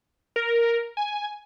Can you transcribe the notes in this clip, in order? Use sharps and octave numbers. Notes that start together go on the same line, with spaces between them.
A#4
G#5